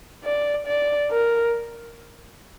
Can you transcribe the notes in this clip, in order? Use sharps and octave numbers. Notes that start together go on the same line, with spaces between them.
D5
D5
A#4